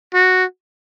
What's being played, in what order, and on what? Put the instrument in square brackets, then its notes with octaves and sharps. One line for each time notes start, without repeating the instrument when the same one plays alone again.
[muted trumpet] F#4